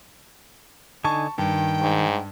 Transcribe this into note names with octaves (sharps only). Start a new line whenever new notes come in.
D3 D#4 G#5 A5 C#6
G2 D#3 G5
G#2